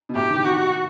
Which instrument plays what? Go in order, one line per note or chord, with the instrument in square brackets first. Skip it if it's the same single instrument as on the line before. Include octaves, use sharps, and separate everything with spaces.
[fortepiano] B2
[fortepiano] A2 [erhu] G4
[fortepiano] D#3
C3
[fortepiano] D#3 [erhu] F#4